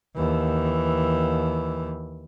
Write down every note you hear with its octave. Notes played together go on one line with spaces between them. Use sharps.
D#2 E3